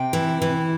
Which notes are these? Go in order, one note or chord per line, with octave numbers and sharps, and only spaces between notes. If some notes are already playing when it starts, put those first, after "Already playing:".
Already playing: C3 G5
E3
E3